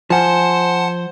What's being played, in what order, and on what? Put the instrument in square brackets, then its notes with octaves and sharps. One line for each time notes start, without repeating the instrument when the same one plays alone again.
[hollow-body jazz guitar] F3 [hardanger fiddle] C5 [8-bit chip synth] F#5 A5 [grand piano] G#5